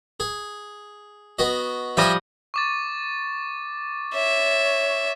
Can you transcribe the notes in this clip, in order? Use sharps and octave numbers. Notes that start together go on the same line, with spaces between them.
G#4
B3 F#4 D#5
F3 G3 D#5 E5 G5 G#5
C#6 D6 A6
C#5 E5